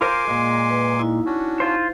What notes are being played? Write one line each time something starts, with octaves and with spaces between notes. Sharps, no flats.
F4 A#4 C5 G#5 C6 D6
A#2 G#3
B4
D#4 E4
C#4 D4 F#4
F4 C5